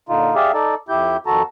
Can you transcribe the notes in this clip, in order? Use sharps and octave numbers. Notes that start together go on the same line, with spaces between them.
A#2 D3 D#4 F4
G4 G#4 D5 E5 F5
D#4 A4 D5
F2 E4 G4 G6
F2 D#3 F#4 A4 A5 A#5